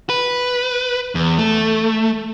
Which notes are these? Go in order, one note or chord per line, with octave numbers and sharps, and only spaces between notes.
B4
E2
A3